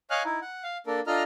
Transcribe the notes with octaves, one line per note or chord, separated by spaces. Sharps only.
C#5 D#5 F5 G#5 F6 F#6
D#4 E4
F#5
F5
A#3 D4 A4 A#4
D4 F4 A4 D#5 A#5 F6